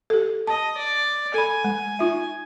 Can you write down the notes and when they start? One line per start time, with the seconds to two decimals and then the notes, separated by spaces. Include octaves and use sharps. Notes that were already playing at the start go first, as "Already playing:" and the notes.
0.10 G4 A4
0.47 D#5 A5
0.77 D5
1.34 A4 G#5 B5
1.64 G#3
1.99 D#4 F4 E5